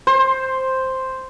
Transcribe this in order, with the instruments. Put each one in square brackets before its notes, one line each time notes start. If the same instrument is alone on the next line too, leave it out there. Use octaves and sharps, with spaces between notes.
[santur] C5